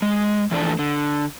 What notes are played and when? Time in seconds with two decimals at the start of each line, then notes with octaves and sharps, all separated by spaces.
0.02 G#3
0.51 E3 F3 A3 D4 D5
0.79 D3